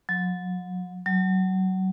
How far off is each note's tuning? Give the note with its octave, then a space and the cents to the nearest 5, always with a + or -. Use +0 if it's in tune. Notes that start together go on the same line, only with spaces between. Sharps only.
F#3 -35
F#3 +25